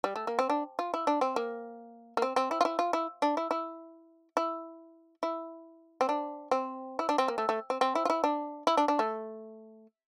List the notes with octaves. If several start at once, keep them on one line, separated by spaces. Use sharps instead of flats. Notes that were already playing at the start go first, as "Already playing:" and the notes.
G3
A3
A#3
C4
D4
F4
E4
D4
C4
A#3
A#3
C4
C4
E4
F4
E4
F4
E4
D4
E4
E4
E4
E4
C4
D4
C4
E4
D4
C4
A#3
A3
A3
C4
C4
E4
F4
E4
D4
E4
D4
D4
A3